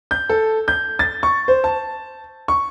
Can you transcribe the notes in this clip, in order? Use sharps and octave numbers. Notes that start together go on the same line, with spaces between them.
G6
A4
G6
A6
C#6
C5
A5
C#6